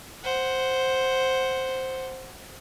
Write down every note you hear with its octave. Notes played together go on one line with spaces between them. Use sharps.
C5 F#5